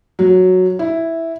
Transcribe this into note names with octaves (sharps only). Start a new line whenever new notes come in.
F#3
E4